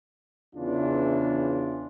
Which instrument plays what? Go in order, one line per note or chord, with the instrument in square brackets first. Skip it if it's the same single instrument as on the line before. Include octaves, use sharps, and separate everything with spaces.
[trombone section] E2 C#3 E3 D4 F4